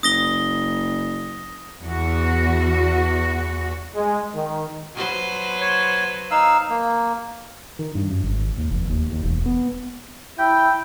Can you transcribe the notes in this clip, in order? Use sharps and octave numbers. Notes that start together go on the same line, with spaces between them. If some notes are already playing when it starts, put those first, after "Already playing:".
F#1 D#6 A#6 G7
E2 F#4
G#3
D#3
F#3 B4 C5
C#5
D#4 F5 E6
A#3
D#3
G2
F#2
G#1
D#2
F1
D#2
D#2
E1
B3
E4 G5